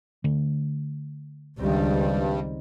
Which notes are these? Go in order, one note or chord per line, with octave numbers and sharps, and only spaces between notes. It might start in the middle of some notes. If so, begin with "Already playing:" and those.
D3 A3
C#2 G2 D#3 G3 C4